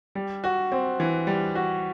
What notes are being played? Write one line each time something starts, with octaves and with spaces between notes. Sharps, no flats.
G3
F#4
C4
E3
G3
F#4